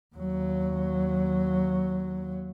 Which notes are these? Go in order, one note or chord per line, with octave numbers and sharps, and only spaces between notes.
D#2 F#3